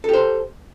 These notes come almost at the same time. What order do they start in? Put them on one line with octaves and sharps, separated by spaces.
A4 G4 C5